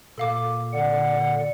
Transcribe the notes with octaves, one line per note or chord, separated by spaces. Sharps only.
A#2 A4 F5 D6
D3 D5 F#5